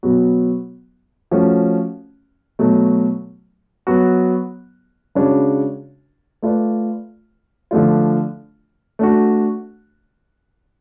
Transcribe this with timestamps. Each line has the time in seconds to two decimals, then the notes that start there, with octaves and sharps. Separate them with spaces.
0.03 B2 F#3 B3 F#4
1.31 F3 A3 C#4 F#4
2.59 B2 F#3 A3
3.87 F#3 B3 F#4
5.15 C#3 G#3 D4 F#4 C#5
6.42 A3 F4 B4 D5
7.71 D3 F3 A3 D4 F4
8.99 A3 D4 F#4